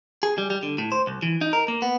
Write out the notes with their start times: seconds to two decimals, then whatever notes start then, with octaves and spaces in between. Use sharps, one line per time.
0.23 G#4
0.38 G3
0.50 G3
0.63 D3
0.78 A2
0.92 C5
1.07 C2
1.22 E3
1.41 D#4
1.53 A#4
1.68 A#3
1.82 B3